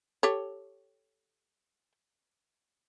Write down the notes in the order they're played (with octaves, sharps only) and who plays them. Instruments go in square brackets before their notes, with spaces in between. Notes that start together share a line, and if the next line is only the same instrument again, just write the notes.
[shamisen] G4 A4 C#5